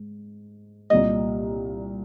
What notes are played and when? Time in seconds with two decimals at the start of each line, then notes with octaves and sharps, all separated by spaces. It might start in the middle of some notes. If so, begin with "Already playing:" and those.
Already playing: G#2
0.90 C2 A#2 G3 D#5